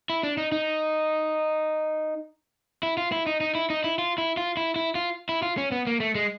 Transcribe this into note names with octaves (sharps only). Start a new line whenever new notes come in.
E4
D4
D#4
D#4
E4
F4
E4
D#4
D#4
E4
D#4
E4
F4
E4
F4
E4
E4
F4
E4
F4
C#4
B3
A#3
A3
G#3